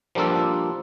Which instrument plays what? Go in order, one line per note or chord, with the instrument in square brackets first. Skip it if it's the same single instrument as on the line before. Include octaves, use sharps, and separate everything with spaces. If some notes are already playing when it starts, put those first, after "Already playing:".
[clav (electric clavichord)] F3 G3 A#3 D4 F4 A4